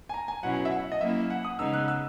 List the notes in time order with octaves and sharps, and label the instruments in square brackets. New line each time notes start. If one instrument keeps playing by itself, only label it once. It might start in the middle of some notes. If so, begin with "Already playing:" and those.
[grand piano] G#5
A#5
G#5
[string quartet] B2 F#3 C#4 E4 [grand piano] F#5
[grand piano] E5
F#5
D#5
[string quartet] F#3 A#3 C#4 E4 [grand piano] E5
[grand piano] F#5
D#6
[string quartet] C#3 G#3 B3 D#4 [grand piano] E6
[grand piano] F#6
E6